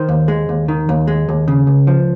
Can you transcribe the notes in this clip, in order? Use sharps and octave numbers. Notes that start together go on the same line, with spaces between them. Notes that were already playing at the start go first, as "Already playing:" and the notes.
Already playing: D#3 C5
D#2
G#3
D#2
D#3
D#2
G#3
D#2
C#3
C#2
F3